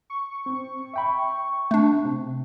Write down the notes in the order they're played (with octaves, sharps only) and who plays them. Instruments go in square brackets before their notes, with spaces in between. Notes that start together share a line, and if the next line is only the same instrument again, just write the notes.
[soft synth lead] C#6
[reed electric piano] C4
E5 G5 B5
[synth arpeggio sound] A3 D4
[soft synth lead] C3